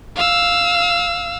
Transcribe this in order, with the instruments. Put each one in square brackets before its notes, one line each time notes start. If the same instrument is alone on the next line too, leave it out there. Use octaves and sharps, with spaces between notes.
[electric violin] F5 E6